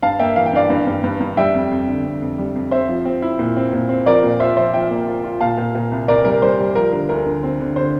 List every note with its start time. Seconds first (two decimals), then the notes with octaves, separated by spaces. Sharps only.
0.02 G2 F5 A5
0.19 A#3 E5 G5
0.36 E3 F5
0.46 G5
0.53 G2 D5 F5
0.70 G2
0.87 G2
1.04 G2
1.20 G2
1.37 G3 E5 G5
1.54 F2
1.71 F2
1.88 D3
2.04 F2
2.22 F2
2.38 G3
2.55 F2
2.71 C4 C5 E5
2.88 F3
3.05 C4
3.22 E4
3.39 A#2
3.57 C4
3.73 A#2
3.89 C4
4.06 F3 A#4 D5
4.23 A#2
4.40 F4 C5 E5
4.57 F3 C5 E5
4.74 F3 E5 G5
4.91 A#3
5.07 F4
5.24 F4
5.40 A#2 F5 A5
5.58 A#2
5.75 A#2
5.92 C2
6.08 C2 A#4 D5
6.25 G3 A#4
6.42 G3 C5
6.59 G3
6.75 F3 A#4
6.92 D3 A#4
7.09 D2 A#4
7.26 D3
7.43 C4
7.60 D3
7.76 D3 C5